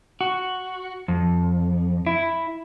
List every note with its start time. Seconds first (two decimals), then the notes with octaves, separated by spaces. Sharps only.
0.21 F#4
1.08 F2
2.07 E4